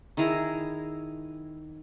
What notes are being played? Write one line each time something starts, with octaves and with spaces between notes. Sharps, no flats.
D#3 E4 G#4 A#5